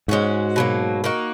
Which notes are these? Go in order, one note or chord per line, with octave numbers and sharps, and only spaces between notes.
G#2 G#3 C#4 F#4
B2 F#3 A#3
A#3 D#4 F#4